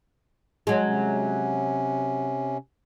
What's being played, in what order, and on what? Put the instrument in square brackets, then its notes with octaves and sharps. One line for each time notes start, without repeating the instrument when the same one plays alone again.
[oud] F#3 G#3
[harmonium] C3 C#4